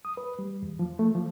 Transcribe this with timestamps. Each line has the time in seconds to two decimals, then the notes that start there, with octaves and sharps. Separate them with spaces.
0.05 D#6
0.17 B4
0.39 G3
0.62 E2
0.79 F3
0.99 A3
1.15 F3